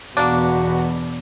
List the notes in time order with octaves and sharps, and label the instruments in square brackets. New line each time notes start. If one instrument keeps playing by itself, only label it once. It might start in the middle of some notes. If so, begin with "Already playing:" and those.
[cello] E2 B2 [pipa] A#3 D4 [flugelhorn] F#4